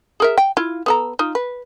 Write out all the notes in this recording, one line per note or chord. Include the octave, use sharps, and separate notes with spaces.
G#4 A#4 E5
G5
E4 F4
B3 A4 A#5
D#4 F4
B4